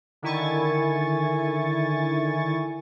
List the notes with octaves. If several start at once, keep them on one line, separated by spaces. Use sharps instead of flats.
D3 D#3 E4 G#5 C#6 A6